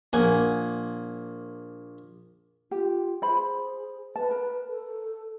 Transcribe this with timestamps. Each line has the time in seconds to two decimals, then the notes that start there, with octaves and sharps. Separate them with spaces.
0.13 A#1 A#3 F#5 G#5
2.71 F4 G4
3.22 G#4 C5 B5
4.16 B4 A5
4.31 A#4
4.69 A4